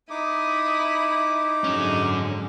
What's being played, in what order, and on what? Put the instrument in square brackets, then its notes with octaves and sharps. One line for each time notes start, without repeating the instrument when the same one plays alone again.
[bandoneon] D#4 [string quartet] E4 D#6 [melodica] D6
[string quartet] G#2 D3 G#3 [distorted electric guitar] F#3 C#4